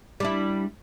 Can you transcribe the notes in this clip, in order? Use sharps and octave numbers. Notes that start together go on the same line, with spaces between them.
G3 D4 E4